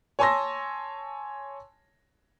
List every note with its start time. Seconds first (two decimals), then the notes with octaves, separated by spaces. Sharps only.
0.19 C#5 G#5 A5 C6 E6 A#6